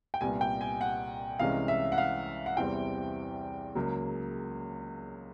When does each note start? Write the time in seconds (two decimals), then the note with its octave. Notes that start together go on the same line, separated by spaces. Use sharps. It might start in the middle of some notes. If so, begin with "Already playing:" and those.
0.14 G5
0.21 C2 A#2 G3 B3 G#5
0.41 G5
0.61 G#5
0.81 F#5
1.39 C2 C3 E3 G#3 C#4 F5
1.68 E5
1.92 F#5
1.98 F5
2.46 F#5
2.57 E2 C3 E3 G3 C4 G5
3.75 C#2 C#3 F#3 A#3